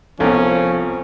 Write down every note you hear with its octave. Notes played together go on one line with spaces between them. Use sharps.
C2 B2 F3 C#4 A4